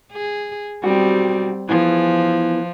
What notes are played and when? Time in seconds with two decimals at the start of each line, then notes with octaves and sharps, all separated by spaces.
0.12 G#4
0.84 B1 G3 C4 F#4
1.69 E3 F3 B3